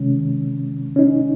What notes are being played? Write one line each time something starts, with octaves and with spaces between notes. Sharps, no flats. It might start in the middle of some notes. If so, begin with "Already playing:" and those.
Already playing: C3 D#3 G#3 C#4
C#4
D#4